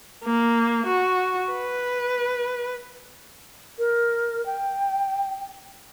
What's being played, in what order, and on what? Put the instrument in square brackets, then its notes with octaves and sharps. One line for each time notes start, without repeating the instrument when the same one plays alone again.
[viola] A#3
F#4
B4
[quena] A#4
G5